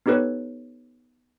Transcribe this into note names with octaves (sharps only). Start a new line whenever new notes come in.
B3 D#4 G4 A4 B4 C#5